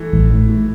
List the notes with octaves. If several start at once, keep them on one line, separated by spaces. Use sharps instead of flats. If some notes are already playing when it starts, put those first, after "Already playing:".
Already playing: E3 A3
A1
A2
A2